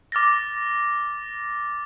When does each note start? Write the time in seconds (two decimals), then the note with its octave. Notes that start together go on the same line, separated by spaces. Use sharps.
0.12 D6 F6 A6 A#6